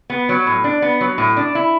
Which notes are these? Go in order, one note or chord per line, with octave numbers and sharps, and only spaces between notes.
B3
F#3
A2
D4
B3
F#3
A2
D4
E4